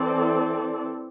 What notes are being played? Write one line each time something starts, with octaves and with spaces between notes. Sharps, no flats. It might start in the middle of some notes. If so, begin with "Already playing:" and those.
Already playing: E3 C4 A4 D5